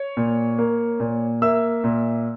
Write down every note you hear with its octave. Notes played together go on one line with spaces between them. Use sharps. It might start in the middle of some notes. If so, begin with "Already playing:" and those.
Already playing: C#5
A#2
A#3
A#2
A#3 E5 E6
A#2